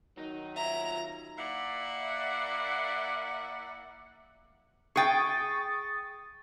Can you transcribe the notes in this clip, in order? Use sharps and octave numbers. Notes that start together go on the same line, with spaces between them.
D#3 F#3 D#4
F4 E5 A#5
A#3 E4 D5 F#5
G#4 G5 C#6 D#6 A6